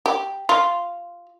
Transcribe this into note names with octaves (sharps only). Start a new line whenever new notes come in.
G4
F4